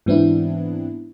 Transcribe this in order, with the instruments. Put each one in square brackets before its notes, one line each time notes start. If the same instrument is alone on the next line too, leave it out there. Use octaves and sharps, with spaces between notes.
[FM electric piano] G#2 E3 B3 C4 D4 E4